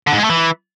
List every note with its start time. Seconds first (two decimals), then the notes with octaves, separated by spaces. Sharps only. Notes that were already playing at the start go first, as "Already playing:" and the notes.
0.07 D3
0.13 G#2
0.18 G#3
0.24 A3
0.30 E3